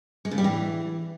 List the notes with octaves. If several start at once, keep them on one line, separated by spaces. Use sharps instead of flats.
G#3
C#3
G3
E3